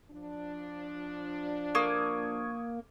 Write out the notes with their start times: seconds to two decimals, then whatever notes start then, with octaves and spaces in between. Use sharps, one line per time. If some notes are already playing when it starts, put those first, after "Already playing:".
0.11 F3 D4
1.75 A#3 C#6 D#6 G#6